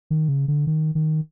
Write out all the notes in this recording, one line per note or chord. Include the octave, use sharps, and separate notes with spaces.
D#3
C#3
D3
D#3
D#3